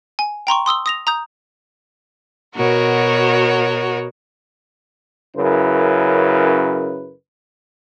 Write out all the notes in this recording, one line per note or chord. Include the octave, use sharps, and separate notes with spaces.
G#5
G5 A#5 C6 C#6
C6 D#6 E6 G7
D#6 A#6 F7
A#5 D#6 G6
B2 F#4 A#4 C#5
F#2 C#3 E4 A#4 B4